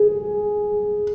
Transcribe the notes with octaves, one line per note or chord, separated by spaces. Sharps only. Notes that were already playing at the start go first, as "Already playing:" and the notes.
Already playing: G#4